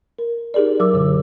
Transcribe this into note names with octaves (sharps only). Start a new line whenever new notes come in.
A#4
D#4 G4 G#4 A#4 D5
F#3 A#4 D6 E6
F#2 B2 D3